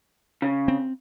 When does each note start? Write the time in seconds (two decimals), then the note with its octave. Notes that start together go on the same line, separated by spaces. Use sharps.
0.42 C#3
0.68 C4